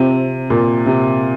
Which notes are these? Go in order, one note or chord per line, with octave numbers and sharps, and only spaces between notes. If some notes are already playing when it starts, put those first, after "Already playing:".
Already playing: C3 C4 F4 C5
A#2
C3